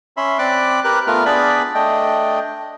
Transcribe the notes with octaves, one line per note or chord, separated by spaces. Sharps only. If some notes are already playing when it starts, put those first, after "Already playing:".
C#4 E5 B5 C6
C4 D5 B5 D6 F#6
G4 A#4 B4 F#6
A3 B3 F4 A#4 F6
B3 D4 G#4 B4 D5 B5
A3 D4 D#5 G5